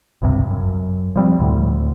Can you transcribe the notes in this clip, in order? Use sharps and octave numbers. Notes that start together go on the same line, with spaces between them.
G#1 C#2 G2 C3
F#2
F3 G3 C4
D2 A2 D3